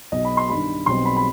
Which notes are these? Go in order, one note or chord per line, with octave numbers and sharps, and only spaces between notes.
B1 B2 B3 D#5
B5
C6
G2 D#3 G3 B5
B1 B2 G3 C4 C6
B5
B5